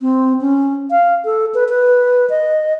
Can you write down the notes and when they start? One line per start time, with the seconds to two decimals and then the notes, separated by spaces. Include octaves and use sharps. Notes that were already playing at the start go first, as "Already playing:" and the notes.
0.01 C4
0.41 C#4
0.91 F5
1.25 A4
1.54 B4
1.69 B4
2.30 D#5